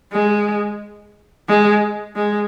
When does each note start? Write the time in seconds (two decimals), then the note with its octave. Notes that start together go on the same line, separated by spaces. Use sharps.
0.13 G#3
1.48 G#3
2.16 G#3